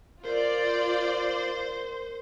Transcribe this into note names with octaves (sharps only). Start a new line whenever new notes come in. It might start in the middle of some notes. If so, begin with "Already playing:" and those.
F4 A#4 C5 D5 G6